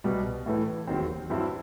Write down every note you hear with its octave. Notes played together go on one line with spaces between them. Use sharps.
C2 B2 G3
A2 E3 A3 E4
E1 D#2 D#3 F#3 C4
G2 F#3 C4 E4